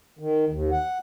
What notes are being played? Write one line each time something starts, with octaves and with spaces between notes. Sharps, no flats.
D#3
D#2
F#5